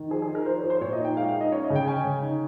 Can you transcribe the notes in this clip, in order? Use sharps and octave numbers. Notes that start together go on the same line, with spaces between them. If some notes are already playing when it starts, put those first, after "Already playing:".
Already playing: D#3
F3 G#4
G#4
D#4
A#4
F3 C5
C#5
F3
C5
A#2 C#5
D#5
D#4
G5
G#3 F5
F5
D#4
D#5
C#4 C#5
D#5
C#3
G5
C#4 G#5
C#3
D#4